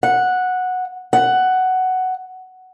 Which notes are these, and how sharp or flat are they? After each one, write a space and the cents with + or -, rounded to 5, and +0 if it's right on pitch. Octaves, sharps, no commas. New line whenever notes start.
F#5 -10
F#5 +10